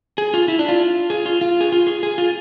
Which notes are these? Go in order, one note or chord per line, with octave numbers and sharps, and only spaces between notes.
G#4
F4
E4
D4
F4
G#4
F4
F4
G#4
F4
G#4
G#4
F4